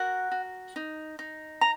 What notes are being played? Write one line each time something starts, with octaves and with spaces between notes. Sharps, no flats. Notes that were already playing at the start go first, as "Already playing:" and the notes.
Already playing: F#4 A#4 F#5
F#4
D#4
D#4
A#5